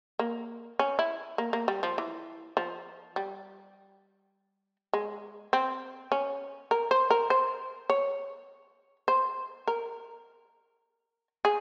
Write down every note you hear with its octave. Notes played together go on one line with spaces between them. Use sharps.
A#3
C#4
E4
A#3
A#3
G3
F3
E3
F3
G3
G#3
C4
C#4
A#4
C5
A#4
C5
C#5
C5
A#4
G#4